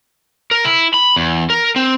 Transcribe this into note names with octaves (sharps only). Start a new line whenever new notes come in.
A#4
E4
B5
E2
A#4
C4